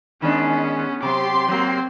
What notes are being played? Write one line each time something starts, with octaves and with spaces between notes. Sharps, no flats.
D#3 G#3 B3 C#4 D4
C3 F#3 G4 C6 D6
F#3 A#3 C4